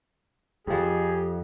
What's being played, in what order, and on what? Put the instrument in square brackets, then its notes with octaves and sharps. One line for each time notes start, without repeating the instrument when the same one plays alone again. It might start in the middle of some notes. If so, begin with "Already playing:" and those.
[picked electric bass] F2 F3 [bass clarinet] G4 [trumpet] G#4